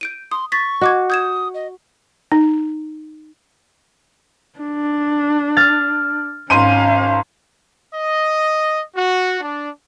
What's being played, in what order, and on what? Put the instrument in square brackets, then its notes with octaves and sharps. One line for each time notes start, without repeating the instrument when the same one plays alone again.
[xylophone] G6 D7 D#7
[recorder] C6 [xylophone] D#6
[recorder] C#6 [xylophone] A6 B6
[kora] F#4 [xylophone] D#5 D6 G#6
[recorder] D#6 [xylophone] G6 G#6 E7
[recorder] D#5
[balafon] D#4
[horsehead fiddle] D4
[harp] F6 A6
[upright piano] G#1 C6 D#7 [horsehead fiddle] C#4 F5
[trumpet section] D#5
F#4
D4